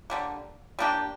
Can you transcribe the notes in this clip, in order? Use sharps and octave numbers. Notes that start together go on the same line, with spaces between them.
D3 G3 A#3
G3 A#3 D4 G4